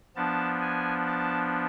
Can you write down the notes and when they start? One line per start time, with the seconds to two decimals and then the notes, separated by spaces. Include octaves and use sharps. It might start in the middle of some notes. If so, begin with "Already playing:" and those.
0.16 F3 B3 D4 A5
0.61 G#5
1.07 A5